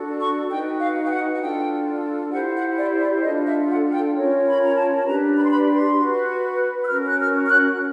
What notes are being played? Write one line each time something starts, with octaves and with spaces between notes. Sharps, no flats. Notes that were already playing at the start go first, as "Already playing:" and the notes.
Already playing: D4 F#4 A4
C#6
D#4 F#4 B4 G5
F5
G5
F#5
F#5
D4 F4 A4 G5
E4 G4 C5 F#5
F#5
D5
D5
D4 F4 A4 D#5
E5
F#5
G5
C#4 F4 A#4 C#5
B5
A#5
A5
A5
D4 G4 B4 A#5
B5
C6
B5
C6
F#4 B4
E6
C#4 F#4 A#4 F6
F#6
F6
F6
F#6